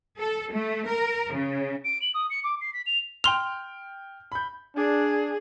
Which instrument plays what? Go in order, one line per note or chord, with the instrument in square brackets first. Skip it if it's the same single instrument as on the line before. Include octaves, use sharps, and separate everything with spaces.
[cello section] A4
A3
A#4
C#3
[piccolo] D7
F#7
D#6
C#7
D6
C7
B6
F7
[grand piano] G5 F6 [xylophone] C6 F7
[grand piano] B5 G6
[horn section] D4 [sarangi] G#4